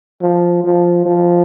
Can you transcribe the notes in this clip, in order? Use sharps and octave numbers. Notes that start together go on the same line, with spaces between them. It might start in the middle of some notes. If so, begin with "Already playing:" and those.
F3
F3
F3